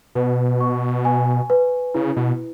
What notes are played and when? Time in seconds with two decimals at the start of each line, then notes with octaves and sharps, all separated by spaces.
0.15 B2 B4
0.60 C#6
1.05 G#5
1.50 B4
1.94 C#3 E4
2.16 B2